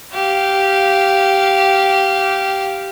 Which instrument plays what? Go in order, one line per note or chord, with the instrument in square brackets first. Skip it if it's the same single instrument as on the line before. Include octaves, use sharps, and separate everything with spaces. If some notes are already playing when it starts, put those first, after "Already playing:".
[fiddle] G4 F5